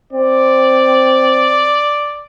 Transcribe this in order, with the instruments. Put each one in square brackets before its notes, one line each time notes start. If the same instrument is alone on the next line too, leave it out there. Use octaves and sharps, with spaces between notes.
[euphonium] C4 [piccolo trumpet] D5